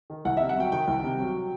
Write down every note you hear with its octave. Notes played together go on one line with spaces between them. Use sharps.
D#3
C2 F#5
C3 E5
F#5
F#3 G5
D#3 G5
C2
C3
F#3